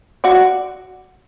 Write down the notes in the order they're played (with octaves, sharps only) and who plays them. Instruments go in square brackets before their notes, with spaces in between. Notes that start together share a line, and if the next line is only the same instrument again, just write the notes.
[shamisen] F#4 D5